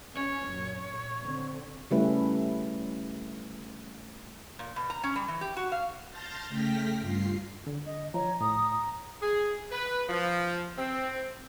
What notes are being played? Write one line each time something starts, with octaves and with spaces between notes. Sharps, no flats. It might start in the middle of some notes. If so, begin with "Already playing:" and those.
C#4 C#5
F#2 A#2
A#1
D3 C4
C#3 G3 A3 C#4 E4 B4
A#2
B2
A#5
C#4
G3
E3
G4
F#4
F5
A5 C6 F6 G6 A6 A#6
C#3 A3 G5 F6 A#6 B6
G2 F4 C7
D3
D#5
F3 C#5 A#5
A2 A#5 D#6
G#4
B4
F3
C4